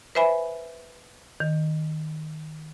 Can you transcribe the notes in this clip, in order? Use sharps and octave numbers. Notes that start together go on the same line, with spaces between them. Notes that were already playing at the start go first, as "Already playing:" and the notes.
B4 C5 E5 G#5 B5
D#3